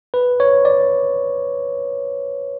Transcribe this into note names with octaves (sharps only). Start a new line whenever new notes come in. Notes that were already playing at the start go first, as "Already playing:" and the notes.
B4
C#5
D5